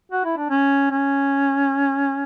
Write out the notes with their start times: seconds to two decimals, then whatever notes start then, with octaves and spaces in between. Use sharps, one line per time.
0.12 F#4
0.25 E4
0.37 D4
0.50 C#4
0.90 C#4